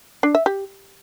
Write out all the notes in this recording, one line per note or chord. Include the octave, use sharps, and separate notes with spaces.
D4
E5
G4